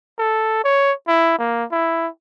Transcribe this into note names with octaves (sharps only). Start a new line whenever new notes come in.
A4
C#5
E4
A#3
E4